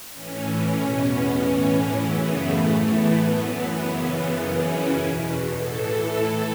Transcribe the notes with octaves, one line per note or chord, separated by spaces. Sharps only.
A2 E3 C#4
C#4
E2 B2
B3
A2 E3 C#4
F#2 C#3 E3 B3
A3
A2 E3
B3
F#2 E3
F#2 C#3 E3
B3
F#2 C#3 E3 C#4
E4
E2 B2
A2 E3 A4
A2 E3